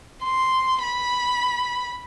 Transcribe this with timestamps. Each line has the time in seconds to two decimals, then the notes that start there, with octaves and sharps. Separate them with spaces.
0.24 C6
0.83 B5